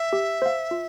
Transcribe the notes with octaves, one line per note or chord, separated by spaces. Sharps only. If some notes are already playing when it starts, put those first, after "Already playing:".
Already playing: E5
G4
C5 F5
F4